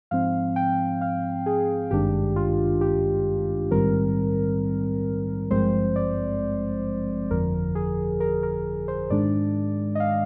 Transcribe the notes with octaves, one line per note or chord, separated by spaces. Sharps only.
G#2 F3 C4 F5
G5
F5
G#4
G#1 G2 D#3 G#3 D4 G4
F4
G4
A#1 G#2 D#3 G3 C4 A#4
G#1 G2 F3 G#3 C4 C5
D5
G1 F2 D3 F3 A#4
G#4
A#4
A#4
C5
G#2 D#3 G#3 D4 D5
D#5
F5